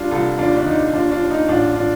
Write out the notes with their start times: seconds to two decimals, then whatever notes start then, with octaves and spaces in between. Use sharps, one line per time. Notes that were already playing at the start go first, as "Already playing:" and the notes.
Already playing: G3 D4 F4
0.11 C2 F4 A4
0.38 D#2 D4 F4
0.57 D4
0.66 D3 D#4
0.93 D#2 D4 F4
1.12 D4 F4
1.21 D#2
1.30 D#4
1.48 A1 D4 F4
1.76 D4 F4